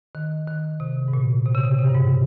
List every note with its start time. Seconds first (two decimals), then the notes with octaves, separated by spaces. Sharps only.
0.15 D#3
0.48 D#3
0.80 C3
1.08 G#2
1.13 A#2
1.46 C3
1.55 C#3
1.63 C3
1.79 C3
1.87 G2
1.94 G#2